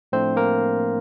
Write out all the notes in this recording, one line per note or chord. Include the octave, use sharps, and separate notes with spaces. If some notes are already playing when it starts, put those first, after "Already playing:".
A2 F3 A3 C4 D4 C5
A#3 A#4